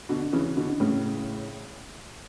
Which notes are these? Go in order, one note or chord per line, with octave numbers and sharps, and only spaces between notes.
B2 D3
C#3 E3
B2 D3
A2 C#3